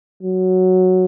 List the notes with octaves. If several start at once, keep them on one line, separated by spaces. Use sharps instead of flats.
F#3